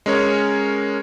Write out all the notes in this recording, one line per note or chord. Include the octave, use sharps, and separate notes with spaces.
G#3 C#4 A#4 C#5